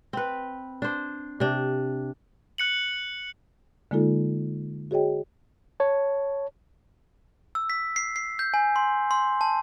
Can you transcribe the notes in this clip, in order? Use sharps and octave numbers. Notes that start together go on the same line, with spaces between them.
C4 B4
D4 C5
C3 D4
F#6 C#7 F#7
D3 G#3 A#3 D#4 F4 A4
F#4 G#4 C#5 D#5 G5
C#5 A5
E6
B6
C7
C7
G6
G#5
C6
C6
A5